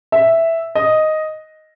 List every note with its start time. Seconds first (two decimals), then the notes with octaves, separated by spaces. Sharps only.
0.12 E5
0.75 D#5